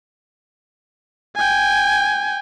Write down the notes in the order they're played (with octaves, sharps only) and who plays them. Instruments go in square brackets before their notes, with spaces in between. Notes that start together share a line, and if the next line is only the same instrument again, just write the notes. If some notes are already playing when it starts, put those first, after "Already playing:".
[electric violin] G5 G#5